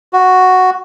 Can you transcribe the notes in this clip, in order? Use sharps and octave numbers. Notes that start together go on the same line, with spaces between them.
F#4